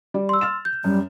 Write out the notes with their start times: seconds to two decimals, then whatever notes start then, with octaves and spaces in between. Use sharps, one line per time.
0.14 G3 D5
0.29 C6 E6
0.41 F6 A6 E7
0.65 G6
0.84 F#2 G3